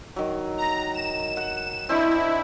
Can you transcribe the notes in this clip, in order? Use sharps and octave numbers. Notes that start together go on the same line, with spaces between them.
D#3 F#3
A#5
E7
F#5
C4 D4 E4 D#5